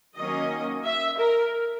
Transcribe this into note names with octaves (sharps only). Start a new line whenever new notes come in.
D#3 F#3 A#3 C#4 D#5
E5
A#4